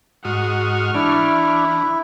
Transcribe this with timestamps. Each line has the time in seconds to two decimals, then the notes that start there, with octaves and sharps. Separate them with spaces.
0.25 G#2 F#4 C#6 D#6 F6
0.95 E3 D4 E4